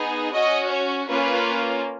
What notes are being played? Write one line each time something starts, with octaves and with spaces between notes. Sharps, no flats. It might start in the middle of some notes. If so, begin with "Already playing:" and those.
Already playing: B3 D#4 G#4
C#4 F#4 D#5
C#5
A#3 C#4 F4 B4